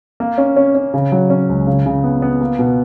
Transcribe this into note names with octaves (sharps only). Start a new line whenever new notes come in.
A#3
C#4
C#4
C#4
C#3
F#3
C#4
C#2
C#3
C#3
B3
B3
A#3
B2